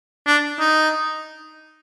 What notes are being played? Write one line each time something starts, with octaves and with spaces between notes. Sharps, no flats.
D4
D#4